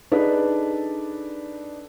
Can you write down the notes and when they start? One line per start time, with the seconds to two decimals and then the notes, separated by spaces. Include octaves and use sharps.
0.12 D4 D#4 G#4 A4 B4 D5